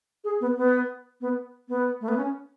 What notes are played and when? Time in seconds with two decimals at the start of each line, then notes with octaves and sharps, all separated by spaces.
0.24 G#4
0.41 B3
0.57 B3
1.21 B3
1.69 B3
2.01 A3
2.08 B3
2.17 C#4